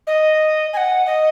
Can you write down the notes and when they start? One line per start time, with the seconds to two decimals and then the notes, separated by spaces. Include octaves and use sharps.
0.07 D#5
0.73 G#5
0.77 F#5
1.06 D#5